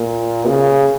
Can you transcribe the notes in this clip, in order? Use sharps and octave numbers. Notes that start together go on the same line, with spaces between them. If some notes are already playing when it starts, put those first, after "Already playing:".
Already playing: A#2
C#3